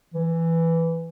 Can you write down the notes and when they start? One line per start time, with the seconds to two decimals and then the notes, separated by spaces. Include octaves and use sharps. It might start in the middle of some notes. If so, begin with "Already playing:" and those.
0.14 E3